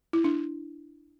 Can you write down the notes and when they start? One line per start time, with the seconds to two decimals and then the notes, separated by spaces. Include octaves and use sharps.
0.13 E4
0.24 D4